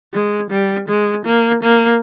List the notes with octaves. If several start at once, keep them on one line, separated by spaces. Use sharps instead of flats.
G#3
G3
G#3
A#3
A#3